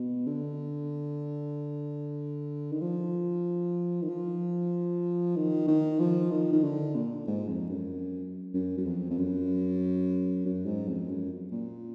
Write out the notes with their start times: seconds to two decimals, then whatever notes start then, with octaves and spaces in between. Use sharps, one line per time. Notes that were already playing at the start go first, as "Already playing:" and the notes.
Already playing: B2
0.27 D3
2.72 D#3
2.81 F3
4.02 D#3
4.09 F3
5.36 D#3
5.68 D#3
6.00 F3
6.31 D#3
6.52 D#3
6.64 D3
6.95 A#2
7.27 G#2
7.48 F2
7.69 F#2
8.54 F#2
8.78 F#2
8.86 F2
9.10 F2
9.18 F#2
10.46 F#2
10.66 G#2
10.88 F2
11.08 F#2
11.52 A#2